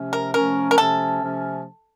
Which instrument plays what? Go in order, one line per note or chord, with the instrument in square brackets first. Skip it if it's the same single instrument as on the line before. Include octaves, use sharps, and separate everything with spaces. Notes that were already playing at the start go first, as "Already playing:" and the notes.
Already playing: [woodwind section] C3 F3 A3 C#4
[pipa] A#4
[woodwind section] C3 F3 A3 C#4 [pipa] A#4
[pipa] A#4
[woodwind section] C3 F3 A3 C#4 [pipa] A4
[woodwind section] C3 F3 A3 C#4